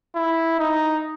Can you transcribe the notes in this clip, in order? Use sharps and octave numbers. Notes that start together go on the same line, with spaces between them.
E4
D#4